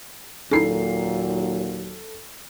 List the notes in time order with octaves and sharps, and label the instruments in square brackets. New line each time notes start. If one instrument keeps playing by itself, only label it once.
[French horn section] D#2 F#3 [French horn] A#2 [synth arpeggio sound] C#4 D#4 E4 [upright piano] A4 C7